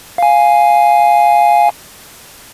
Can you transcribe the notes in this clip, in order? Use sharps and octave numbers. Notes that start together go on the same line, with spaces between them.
F5 G#5